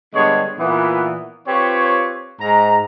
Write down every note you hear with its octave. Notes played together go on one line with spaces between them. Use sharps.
D3 G3 G#3 B3 C#5
A#2 E3 B3
C4 F4 G4 B4 C#5
G#2 A#5